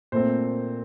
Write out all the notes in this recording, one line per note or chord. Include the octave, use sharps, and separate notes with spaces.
A#2 A3 C4 C5